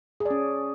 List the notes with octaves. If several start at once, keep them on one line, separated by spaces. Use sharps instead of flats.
G#4
D5
C#4